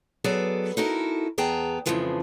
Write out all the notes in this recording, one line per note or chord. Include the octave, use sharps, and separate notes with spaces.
F#3 B3 G#4 A4 D5
D#4 E4 F#4 A4 A#4 D#5
E2 B3 G#4 G5 A5 A#5
F2 A2 C#3 E3 F3 G#3